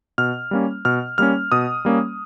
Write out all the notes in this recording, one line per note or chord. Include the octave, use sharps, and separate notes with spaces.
B2 F6
G3 A#3 C#4
B2 F6
G3 A#3 C#4 F6
B2 D#6
G3 A#3 C#4